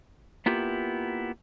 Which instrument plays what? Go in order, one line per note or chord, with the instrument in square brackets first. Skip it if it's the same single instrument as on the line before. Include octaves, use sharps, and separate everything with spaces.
[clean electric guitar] A#3 B3 E4 F4 G4